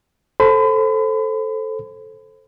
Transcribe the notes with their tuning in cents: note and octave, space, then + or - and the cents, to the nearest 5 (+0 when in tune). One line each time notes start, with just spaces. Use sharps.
A4 +0 C5 +15 B5 +40